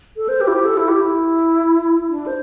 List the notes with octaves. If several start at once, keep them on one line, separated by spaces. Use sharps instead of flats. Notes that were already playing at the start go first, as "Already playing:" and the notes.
A4
C5
G4
E4
G4
A4
E4
G4
E4
D4
C5